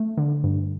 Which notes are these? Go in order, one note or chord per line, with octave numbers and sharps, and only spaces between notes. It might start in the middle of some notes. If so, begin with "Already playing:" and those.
Already playing: A3
D3
G2